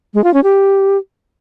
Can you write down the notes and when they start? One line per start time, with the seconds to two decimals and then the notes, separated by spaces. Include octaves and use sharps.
0.14 G#3
0.24 F4
0.34 C#4
0.44 G4